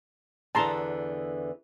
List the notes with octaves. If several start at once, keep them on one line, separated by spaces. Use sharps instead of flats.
E2 D3 E3 A5 A#5 C6